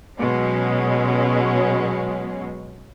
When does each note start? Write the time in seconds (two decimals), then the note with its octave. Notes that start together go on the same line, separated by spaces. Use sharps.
0.19 B2 F#3 G#3 C#4